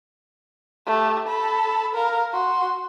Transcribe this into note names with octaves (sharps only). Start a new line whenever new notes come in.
A3 G4
A4 B5
A#4 F5
F#4 C6